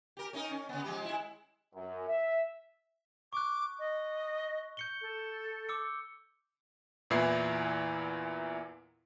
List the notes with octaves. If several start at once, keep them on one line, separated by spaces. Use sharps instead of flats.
G4 A#4
C#4 D#4 A#4
C#4
C#3 B3
F3 G#3 G4
G#3 E4
F#2
E5
C#6 D6 F#6
D#5
G6 C#7 G7
A4
D6 E6 C#7
E2 A#2 E3 E4 C7